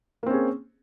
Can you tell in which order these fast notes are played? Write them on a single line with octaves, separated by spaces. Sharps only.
A#3 C4 C#4 G#4